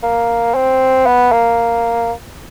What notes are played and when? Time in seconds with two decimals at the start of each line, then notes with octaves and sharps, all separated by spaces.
0.03 A#3
0.55 C4
1.06 B3
1.32 A#3